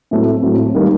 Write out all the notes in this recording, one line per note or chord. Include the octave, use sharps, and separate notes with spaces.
A2 F#3 A3 C4
A2 F#3 A3 C4
D#3 G3 A#3 D#4